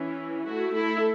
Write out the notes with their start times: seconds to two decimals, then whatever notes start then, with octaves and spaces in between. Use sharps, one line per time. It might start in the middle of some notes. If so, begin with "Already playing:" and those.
Already playing: E3 C#4 E4
0.45 A3 E4 F#4
0.74 E4 A4